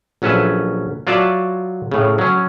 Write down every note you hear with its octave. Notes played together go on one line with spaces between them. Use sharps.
A#1 F#3 C#4 A4 B4 E5
F#3 F4 F#4 D5 E5 A5
A2 C#3
F#3 C#4